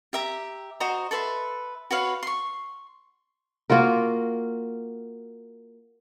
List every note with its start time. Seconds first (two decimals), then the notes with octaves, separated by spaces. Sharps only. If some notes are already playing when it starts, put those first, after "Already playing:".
0.13 G4 E5 A#5
0.80 F#4 C5 D#5 A#5
1.11 A4 B4 E5 C6
1.91 F#4 B4 C#5 F5
2.23 C6 C#6
3.70 A#3 F4 F#4 A#4